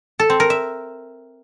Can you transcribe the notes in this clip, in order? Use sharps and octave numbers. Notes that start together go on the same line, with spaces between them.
A4
C4
A#4
E5